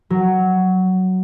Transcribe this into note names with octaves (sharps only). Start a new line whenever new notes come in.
F#3